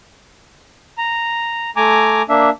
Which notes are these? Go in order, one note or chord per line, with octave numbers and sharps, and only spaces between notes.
A#5
A3 G#5 A#5 D6
A#3 D4 E5